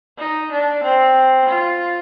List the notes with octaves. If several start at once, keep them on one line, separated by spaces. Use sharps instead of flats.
D#4
D4
C4
F4